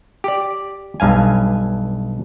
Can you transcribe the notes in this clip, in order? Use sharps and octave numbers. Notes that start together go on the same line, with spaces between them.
G4 D5
B1 G2 F5 G#5